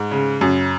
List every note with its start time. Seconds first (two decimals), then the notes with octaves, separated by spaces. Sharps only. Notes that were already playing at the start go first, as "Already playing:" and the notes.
Already playing: G#2
0.11 C#3
0.41 F#2